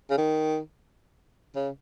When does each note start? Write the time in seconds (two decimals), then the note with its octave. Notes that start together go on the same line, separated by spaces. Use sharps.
0.10 C#3
0.18 D#3
1.56 C#3